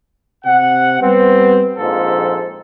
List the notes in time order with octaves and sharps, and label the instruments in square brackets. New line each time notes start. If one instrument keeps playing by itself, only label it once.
[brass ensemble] C3 F#5
G3 B3 C4
A#1 F2 G#2 F3 A4